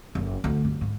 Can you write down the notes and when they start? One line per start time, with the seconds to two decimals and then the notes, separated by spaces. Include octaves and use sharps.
0.15 F#1
0.44 D2
0.64 G2
0.81 G#2